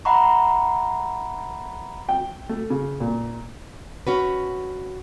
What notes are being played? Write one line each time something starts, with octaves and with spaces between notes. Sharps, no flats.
E5 F#5 A#5 B5 C#6
G5
A3
C#3
A#2
C#4 F#4 B4